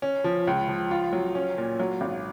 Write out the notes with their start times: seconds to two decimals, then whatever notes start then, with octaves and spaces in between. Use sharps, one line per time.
0.02 C#4
0.24 F3
0.47 C#2
0.68 F3
0.91 F4
1.13 F#3
1.35 C#4
1.58 A#2
1.80 F#3
2.01 G#1